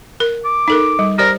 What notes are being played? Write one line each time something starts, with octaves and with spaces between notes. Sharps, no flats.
A#4
D6
D#4 A4 A#4
G3
G4 A#4 C5 D5